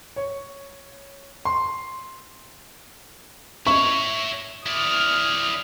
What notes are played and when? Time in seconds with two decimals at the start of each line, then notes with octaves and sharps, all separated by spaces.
0.16 C#5
1.45 C6
3.67 E4 C#5 C#6
4.66 E4 D5 D#6 F6